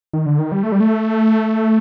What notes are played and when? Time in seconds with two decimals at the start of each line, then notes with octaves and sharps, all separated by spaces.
0.13 D#3
0.26 D3
0.39 D#3
0.52 G3
0.63 A3
0.72 G3
0.80 A3